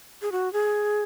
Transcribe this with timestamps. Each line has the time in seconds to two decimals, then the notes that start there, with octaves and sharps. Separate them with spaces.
0.22 G#4
0.32 F#4
0.53 G#4